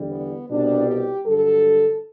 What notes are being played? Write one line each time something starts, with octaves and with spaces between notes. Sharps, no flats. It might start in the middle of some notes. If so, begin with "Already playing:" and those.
Already playing: E2 D3 G3
B3
C2 B2 G3 B3 D4
G4
G2 D3 F#3 A4